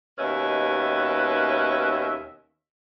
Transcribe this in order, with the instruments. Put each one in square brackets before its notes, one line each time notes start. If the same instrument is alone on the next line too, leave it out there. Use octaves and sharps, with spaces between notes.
[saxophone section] D#2 B2 C#4 B4 D#5 E5